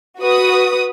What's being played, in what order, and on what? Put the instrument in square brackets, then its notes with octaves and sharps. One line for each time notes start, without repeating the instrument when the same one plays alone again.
[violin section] F#4 B4 D#6